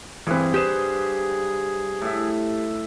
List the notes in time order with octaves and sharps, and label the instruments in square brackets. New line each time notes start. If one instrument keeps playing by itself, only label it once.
[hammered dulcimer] G2 B4 [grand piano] E3 C4 [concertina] G#4
[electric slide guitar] G4 C5 [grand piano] D#6 E7
[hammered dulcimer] A2 E5